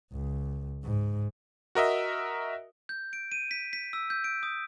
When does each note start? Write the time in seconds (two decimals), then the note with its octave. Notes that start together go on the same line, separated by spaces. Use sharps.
0.12 C#2
0.84 G#2
1.75 F#4 A#4 D#5 E5
2.89 G6
3.13 D7
3.32 D#7
3.51 B6
3.73 B6
3.93 E6
4.10 G6
4.24 D7
4.43 D#6